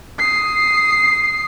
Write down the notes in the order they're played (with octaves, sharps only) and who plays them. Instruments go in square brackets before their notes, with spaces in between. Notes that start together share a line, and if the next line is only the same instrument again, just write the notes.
[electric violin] D#6 C7